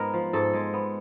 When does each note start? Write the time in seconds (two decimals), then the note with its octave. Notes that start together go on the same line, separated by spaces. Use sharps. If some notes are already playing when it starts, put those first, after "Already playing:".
Already playing: G#2 G#3 B3 A#4
0.14 F3
0.33 G#2 A4
0.53 G#3
0.73 B3